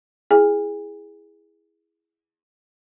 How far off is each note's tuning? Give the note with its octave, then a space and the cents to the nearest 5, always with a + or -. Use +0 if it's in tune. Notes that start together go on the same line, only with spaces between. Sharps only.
E4 +0 G#4 +0 G#5 -35